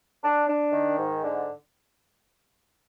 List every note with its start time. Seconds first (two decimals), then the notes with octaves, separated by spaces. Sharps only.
0.23 D4
0.48 D4
0.72 D#3
0.97 G#2
1.22 D3